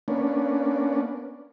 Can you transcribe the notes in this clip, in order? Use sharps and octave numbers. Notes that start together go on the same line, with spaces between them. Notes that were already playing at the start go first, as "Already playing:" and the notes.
A#3 B3 C#4 D4